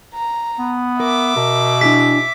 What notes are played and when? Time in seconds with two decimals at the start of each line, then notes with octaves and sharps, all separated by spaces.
0.14 A#5
0.59 B3
1.00 A#4 E5 D6
1.36 B2 A#4
1.81 D4 E4 G#4 B6